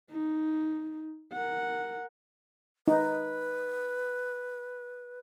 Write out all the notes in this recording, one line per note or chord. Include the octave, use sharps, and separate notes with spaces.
D#4
A#4 F#5
D#4 B4